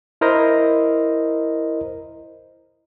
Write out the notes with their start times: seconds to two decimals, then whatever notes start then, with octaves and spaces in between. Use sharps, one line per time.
0.21 E4 A#4 C5 D#5